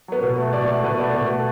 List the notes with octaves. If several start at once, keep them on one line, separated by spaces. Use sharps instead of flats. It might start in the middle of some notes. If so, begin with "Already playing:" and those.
F#3 B3
B2
A3
B2 D5
A3
B2 B4
A3 D5
B2 B4
A3